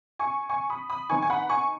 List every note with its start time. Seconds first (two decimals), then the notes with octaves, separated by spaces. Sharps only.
0.19 G#5 C#6
0.49 G#5 C#6
0.70 B5 D#6
0.90 B5 D#6
1.10 D#3 B3 D#4 G#5 C#6
1.22 G#5
1.30 F#5 B5
1.50 G#5 C#6